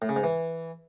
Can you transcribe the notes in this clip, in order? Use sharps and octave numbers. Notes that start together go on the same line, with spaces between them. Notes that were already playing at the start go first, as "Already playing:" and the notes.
A2
C#3
G#2
E3